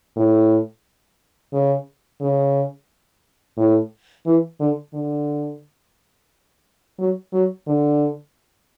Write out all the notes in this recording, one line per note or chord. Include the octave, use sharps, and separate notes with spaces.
A2
C#3
C#3
A2
E3
D3
D3
F#3
F#3
D3